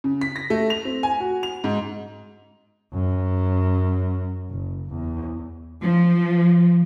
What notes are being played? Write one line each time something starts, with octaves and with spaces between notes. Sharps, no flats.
C#3
B6
A#6
A3
F7
C4
G#5
F#4
F7
G#2
F#2
F#1
E2
F3